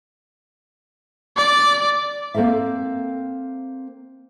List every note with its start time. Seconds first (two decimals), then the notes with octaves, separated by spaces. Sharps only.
1.36 D5
2.34 A#3 C4 A4 A#4 E5